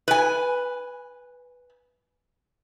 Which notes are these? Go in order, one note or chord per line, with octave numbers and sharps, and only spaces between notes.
B4 G#5